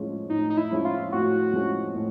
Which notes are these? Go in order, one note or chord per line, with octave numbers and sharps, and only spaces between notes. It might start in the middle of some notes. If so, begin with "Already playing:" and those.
Already playing: A2 F3 G#3 C#4
A2 D#4
D#4
E4
F3 G#3 C#4
F4
A2 F#4
F3 G#3 C#4
A2